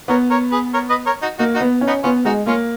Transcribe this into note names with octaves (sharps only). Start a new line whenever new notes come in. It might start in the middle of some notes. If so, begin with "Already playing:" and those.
B3 A#4 C#5
A#4 C#5
G#4 B4
A#4 C#5
B4 D#5
A#4 C#5
D#4 F#4
A#3 D#4 F#4
D#4 F#4
B3
C#4
B3 D#4
B3 C#4 F4
G#3 D#4 F#4
A#3 C#4 F4